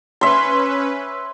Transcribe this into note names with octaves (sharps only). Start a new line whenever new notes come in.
C#4 B4 E5 C6